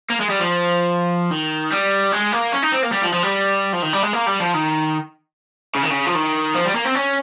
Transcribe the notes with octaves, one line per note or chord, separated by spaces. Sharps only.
A#3
G#3
G3
F3
D#3
G3
G#3
A#3
C#4
D#4
C4
A#3
G3
F3
F3
G3
F3
D#3
G3
G#3
A#3
G3
F3
D#3
C#3
D#3
C#3
F3
D#3
F3
G3
A#3
C4
C#4